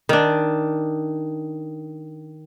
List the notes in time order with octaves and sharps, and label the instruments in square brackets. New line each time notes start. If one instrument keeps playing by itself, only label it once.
[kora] D#3 D4